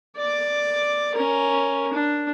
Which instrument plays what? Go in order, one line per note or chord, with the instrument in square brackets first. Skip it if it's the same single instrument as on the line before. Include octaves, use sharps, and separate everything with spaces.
[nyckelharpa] D5 D6
C#4 A#4
D4